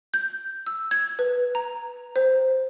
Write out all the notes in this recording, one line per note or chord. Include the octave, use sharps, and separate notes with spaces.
G6
E6
G#6
B4
A#5
C5